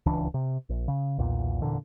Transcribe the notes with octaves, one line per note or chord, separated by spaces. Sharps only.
D1 C#2 E3 D4
C3
A#1
C#3
B1 E2 A#2
F1 E2 A#2 D3